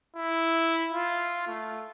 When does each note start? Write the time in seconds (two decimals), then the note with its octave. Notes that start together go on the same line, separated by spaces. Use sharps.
0.16 E4
0.92 F4
1.48 A3